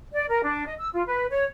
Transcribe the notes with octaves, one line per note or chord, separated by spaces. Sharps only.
D5
A#4
D4
D#5
E6
F4
B4
C#5